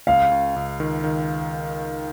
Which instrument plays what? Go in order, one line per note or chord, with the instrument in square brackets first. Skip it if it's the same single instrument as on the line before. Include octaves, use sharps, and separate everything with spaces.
[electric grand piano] C#2 [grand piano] F5
[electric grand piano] C#2
C#2
D#3
D#3